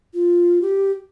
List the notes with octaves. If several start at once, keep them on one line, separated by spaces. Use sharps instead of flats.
F4
G4